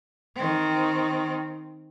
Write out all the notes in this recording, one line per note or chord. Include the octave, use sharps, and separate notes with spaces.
D#3 C4